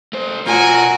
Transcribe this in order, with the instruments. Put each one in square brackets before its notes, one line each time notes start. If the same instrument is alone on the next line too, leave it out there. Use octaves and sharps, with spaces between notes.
[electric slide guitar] A3 C5
[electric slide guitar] B2 F4 [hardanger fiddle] F#4 [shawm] A#4 [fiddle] G#5